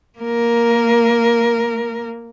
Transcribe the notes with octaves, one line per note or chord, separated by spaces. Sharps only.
A#3 A#4